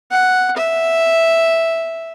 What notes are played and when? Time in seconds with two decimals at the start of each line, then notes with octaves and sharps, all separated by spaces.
0.11 F#5
0.57 E5